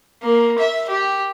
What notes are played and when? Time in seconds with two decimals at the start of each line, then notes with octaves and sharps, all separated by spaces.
0.22 A#3
0.58 E5
0.89 G4